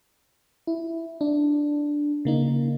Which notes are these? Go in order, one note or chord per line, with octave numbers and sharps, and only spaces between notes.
E4
D4
C#3 A#3 D#4